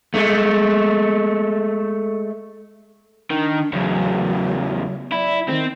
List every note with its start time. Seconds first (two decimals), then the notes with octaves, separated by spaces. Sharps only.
0.14 G#3 A3
3.31 D#3 D4
3.73 E2 C#3 F#3
5.12 E4 D5
5.49 D#3 C4